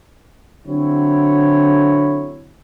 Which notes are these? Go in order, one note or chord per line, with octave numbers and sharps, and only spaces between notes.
D3 F#3 C4 E4 C#5